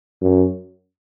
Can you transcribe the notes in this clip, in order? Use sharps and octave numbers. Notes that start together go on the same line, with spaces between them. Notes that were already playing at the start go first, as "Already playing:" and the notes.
F#2